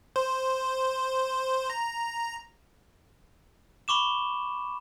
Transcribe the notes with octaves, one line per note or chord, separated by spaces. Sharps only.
C5
A#5
B5 C#6 D6 E7